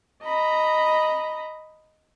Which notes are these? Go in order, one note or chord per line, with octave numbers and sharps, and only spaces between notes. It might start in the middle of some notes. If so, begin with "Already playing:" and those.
D#5 A#5 B5